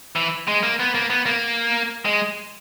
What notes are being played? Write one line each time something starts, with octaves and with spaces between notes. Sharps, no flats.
E3
G#3
A#3
B3
A#3
B3
A#3
G#3